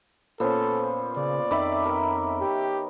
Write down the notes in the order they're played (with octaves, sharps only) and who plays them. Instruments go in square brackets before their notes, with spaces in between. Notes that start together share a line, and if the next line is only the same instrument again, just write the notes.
[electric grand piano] A#2 C5 [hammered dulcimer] B3 C#4 [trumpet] A4
[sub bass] C#3 [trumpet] D5
[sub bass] F2 [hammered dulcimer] D#3 [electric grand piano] E5 B5 D6
[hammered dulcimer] B3 A#4 G5
[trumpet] G4